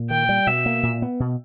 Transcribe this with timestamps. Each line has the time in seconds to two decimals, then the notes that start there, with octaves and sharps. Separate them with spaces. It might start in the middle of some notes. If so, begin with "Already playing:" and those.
Already playing: A#2
0.10 D#3 G5
0.29 G3
0.47 B2 E5
0.66 A#3
0.83 A#2
1.02 B3
1.20 B2